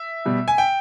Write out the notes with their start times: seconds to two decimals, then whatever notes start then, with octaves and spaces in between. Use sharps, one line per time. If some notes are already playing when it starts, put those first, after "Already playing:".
Already playing: E5
0.25 B2 G3
0.48 G#5
0.58 G5